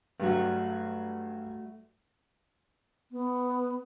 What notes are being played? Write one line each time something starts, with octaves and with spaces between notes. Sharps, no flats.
G2 F#3 G3 A3 F#4
B3